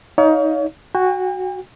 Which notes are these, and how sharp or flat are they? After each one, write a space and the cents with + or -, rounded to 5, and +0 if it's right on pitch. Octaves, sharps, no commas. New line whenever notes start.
D#4 +20 C#5 +40 F5 +15
F#4 +0 G5 +45